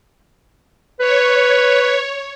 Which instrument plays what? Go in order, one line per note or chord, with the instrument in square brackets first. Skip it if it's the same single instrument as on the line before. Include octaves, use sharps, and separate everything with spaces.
[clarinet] B4 [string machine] C#5